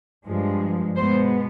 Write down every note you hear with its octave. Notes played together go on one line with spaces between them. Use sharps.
G2 F3 G#3
B2 G#3 B3 C5